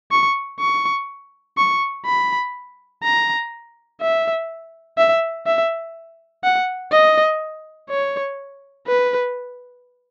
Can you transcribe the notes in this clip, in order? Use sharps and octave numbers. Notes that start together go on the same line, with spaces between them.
C#6
C#6
C#6
B5
A#5
E5
E5
E5
F#5
D#5
C#5
B4